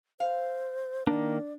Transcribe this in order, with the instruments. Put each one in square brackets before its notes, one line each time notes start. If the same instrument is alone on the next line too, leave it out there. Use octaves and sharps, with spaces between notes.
[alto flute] C5 [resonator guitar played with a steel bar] F5
[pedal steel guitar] D#3 A#3 [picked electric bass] D4 [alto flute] D5